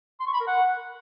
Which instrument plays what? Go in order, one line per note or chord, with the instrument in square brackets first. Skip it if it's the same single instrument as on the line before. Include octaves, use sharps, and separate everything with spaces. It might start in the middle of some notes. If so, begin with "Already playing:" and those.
[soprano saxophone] C6
C#6
B5
A#4
F#5